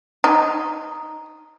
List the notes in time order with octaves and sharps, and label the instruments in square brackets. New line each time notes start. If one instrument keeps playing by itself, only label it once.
[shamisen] D#4